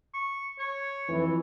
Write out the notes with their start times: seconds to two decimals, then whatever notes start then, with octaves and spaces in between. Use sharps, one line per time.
0.14 C#6
0.59 C#5
1.09 F2 E3